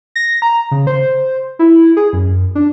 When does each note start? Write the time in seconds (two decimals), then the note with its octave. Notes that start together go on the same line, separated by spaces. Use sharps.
0.15 A#6
0.42 A#5
0.71 C#3
0.87 C5
1.59 E4
1.97 G#4
2.13 F#2
2.55 D4